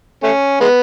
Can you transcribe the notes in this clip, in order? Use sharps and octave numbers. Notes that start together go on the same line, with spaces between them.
A3 C#4
G#3 B3